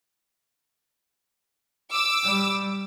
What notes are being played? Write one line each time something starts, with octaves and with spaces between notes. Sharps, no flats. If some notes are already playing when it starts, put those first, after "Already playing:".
D6 E6
G3